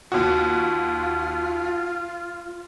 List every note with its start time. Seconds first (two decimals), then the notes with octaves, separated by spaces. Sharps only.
0.12 D#2 F4 F#4